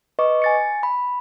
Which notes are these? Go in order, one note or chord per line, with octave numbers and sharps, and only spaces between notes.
B4 D#5 C#6 D6
G#5 A6 C#7
B5